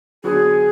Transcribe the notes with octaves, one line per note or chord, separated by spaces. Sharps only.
D3 F#3 B3 F#4 G#4